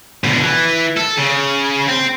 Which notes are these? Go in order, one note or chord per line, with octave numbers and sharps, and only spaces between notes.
B2 D3
E3
A4
C#3
C4